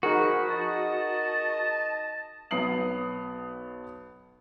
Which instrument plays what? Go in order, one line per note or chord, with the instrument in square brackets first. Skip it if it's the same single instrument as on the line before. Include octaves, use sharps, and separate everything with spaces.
[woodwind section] F3 F#5 B5 [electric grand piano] D#4 G#4 A#4 [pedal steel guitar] F#4
[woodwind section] D#5 A5
[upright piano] B1 B3 D#6 C7 F#7